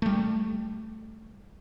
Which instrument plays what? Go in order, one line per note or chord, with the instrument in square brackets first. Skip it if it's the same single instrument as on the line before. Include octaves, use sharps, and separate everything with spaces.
[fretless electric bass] G3 A3